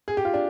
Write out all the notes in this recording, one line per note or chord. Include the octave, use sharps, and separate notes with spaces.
G#4
G4
F4
D4